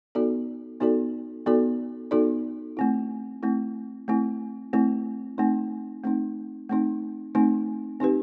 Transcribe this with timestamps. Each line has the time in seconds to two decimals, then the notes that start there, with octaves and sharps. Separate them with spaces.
0.15 B3 D#4 F#4 A4 D5
0.80 B3 D#4 F#4 A4 D5
1.46 B3 D#4 F#4 A4 D5
2.11 B3 D#4 F#4 A4 D5
2.77 A3 C4 E4
3.43 A3 C4 E4
4.08 A3 C4 E4
4.73 A3 C4 E4
5.38 A3 C4 D#4
6.04 A3 C4 D#4
6.69 A3 C4 D#4
7.35 A3 C4 D#4
8.00 C4 D#4 G4 B4